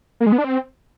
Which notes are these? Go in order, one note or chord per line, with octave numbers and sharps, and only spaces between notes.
A#3
G#3
B3
D4
C4